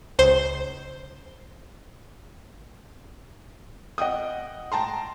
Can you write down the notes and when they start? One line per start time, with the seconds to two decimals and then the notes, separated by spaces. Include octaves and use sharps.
0.19 C#2 C5 C6
3.98 D#5 F#5 G5 D#6
4.72 G5 A5 A#5 C6